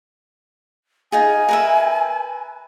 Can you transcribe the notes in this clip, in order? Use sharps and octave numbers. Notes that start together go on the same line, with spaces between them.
D#4 F4 G#4 G#5
A#4 B4 E5